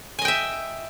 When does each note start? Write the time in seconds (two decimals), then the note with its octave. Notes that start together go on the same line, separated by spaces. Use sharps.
0.19 G#5
0.22 D#5
0.25 G5
0.28 E5